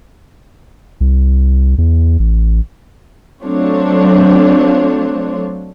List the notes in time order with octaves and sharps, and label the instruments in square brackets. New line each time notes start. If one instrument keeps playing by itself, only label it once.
[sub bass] C2
E2
A1
[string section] F#3 A3 C4 D4 F4 C#5